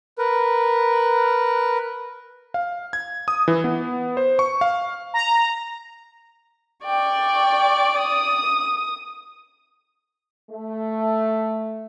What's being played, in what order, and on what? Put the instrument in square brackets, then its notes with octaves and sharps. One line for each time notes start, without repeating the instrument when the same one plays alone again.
[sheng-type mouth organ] A#4 B4
[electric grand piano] F5
G#6
D#6
E3
B3
C5
C#6
F5
[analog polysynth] A#5
[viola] D5 [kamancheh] G5 C#6
[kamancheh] D#6
[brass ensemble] A3